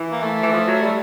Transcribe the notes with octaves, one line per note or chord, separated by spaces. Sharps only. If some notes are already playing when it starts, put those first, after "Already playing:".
Already playing: E3
A#3
A3
E3
F3
F#3
G3